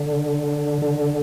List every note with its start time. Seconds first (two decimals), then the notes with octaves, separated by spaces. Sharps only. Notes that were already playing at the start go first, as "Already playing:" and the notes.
Already playing: D3
0.82 D3